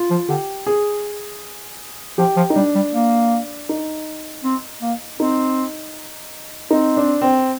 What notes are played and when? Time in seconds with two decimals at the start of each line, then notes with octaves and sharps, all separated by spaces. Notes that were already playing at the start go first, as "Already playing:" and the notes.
Already playing: F4
0.10 F3
0.29 D3 G4
0.66 G#4
2.18 F3 G4
2.36 F3
2.50 D#4
2.55 G3 D4
2.75 G3
2.93 A#3
3.69 D#4
4.44 C4
4.82 A#3
5.19 C4 D#4
6.71 C4 D#4
6.97 D4
7.21 C4